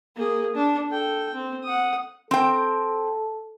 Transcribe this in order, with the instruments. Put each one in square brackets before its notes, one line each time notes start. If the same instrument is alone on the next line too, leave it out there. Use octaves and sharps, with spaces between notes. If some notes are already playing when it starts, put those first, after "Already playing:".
[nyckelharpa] A#3 G#4
D4
A4 G5
C4
F#5 D#6
[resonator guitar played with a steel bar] C4 G5 [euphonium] A4